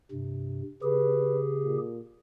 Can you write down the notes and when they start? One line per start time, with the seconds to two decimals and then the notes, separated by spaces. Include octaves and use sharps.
0.12 G2 C3
0.82 C#3 G4 G#4 B4
1.62 A#2